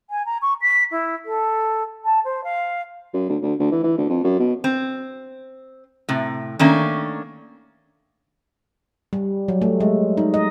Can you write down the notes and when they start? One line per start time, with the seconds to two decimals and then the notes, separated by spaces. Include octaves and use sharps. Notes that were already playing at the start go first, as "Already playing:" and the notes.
0.10 G#5
0.26 A#5
0.41 C#6
0.61 B6
0.91 E4
1.25 A4
2.04 A5
2.24 C5
2.44 F5
3.14 F#2
3.29 D2
3.42 D2
3.60 D2
3.71 E3
3.84 E3
3.97 D2
4.09 F2
4.24 F#2
4.40 B2
4.64 C4
6.09 A2 C3
6.59 D#3 A3 A#3 C#4 D4
9.13 G3
9.48 F#3
9.62 A3
9.80 G#3
10.17 D#4
10.34 D#5